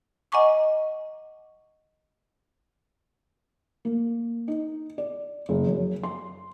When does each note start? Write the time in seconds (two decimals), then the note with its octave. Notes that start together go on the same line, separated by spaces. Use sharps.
0.32 D#5 F#5 G#5 A#5 C#6 D6
3.85 A#3
4.48 D#4
4.98 D5
5.49 F#1
5.67 F#2
6.03 C6